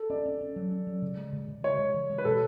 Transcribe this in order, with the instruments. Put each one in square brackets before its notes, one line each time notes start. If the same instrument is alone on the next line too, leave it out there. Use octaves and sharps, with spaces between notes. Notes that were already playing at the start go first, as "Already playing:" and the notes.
Already playing: [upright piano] A4
[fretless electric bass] C#4 [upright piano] D5
[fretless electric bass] C#4
C#4
F#3
C#4
F#3
C#3
G#3
C#3
C#3
[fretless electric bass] G#3 [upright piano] C#5
[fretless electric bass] C#3
E3
G#3
[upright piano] B4
[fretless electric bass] B2 [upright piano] A4